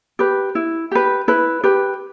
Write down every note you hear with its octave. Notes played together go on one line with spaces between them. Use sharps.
G4 B4
E4
G4 B4
E4 B4
G4 B4